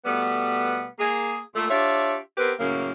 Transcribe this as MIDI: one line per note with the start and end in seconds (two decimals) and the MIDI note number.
0.05 0.87 47
0.05 0.87 55
0.05 0.87 57
0.05 0.87 59
0.99 1.40 58
0.99 1.40 68
1.55 1.69 46
1.55 1.69 57
1.70 2.17 62
1.70 2.17 65
1.70 2.17 67
1.70 2.17 73
1.70 2.17 76
2.38 2.52 59
2.38 2.52 60
2.38 2.52 67
2.38 2.52 70
2.38 2.52 71
2.59 2.92 42
2.59 2.92 45
2.59 2.92 49
2.59 2.92 58